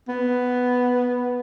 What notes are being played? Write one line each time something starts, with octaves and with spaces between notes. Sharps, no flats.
B3